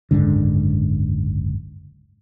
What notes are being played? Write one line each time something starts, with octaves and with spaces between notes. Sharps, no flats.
F#1 C#2 G#2 D3